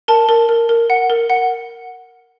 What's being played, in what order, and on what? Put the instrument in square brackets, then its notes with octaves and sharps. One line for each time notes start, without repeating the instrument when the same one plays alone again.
[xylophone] A#4 A5
A#4
A#4
A#4
F#5
A#4
F#5